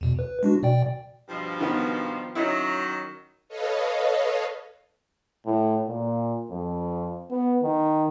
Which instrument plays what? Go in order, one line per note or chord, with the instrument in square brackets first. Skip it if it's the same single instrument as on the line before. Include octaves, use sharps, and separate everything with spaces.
[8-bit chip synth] E2 B2
B4
G#3 D4 F#4
B2 D5 G5
[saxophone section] G2 B2 F3
[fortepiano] D#3 B3
[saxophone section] D#3 F#3 [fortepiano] C#4 D#4 E4
[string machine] A4 B4 C#5 D#5 F5
[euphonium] A2
A#2
F2
B3
D#3